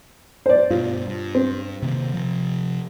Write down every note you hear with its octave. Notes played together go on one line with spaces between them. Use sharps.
C5 D5
G2 B2 F4
G2
C4
C3 D#3 A#3
C3 F3